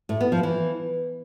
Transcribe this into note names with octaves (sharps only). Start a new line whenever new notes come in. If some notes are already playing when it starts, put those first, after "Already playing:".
A2
B3
F3
E3